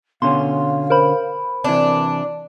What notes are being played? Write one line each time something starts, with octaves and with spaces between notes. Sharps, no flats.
B2 D3 C#4 F5 C6
A#4 C5 B5
C3 E3 D4 A5